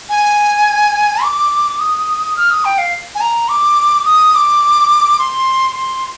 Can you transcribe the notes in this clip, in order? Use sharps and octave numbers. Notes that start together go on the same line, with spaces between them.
G#5
D6
D#6
F6
D#6
G5
F5
G#5
A#5
D6
D#6
D6
C6
C6